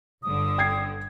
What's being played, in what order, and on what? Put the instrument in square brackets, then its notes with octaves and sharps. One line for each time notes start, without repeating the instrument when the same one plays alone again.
[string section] G1 G2 D3 [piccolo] D#6
[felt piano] G5 G#6 C7